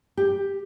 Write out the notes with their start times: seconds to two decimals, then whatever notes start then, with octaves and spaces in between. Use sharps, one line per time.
0.17 G4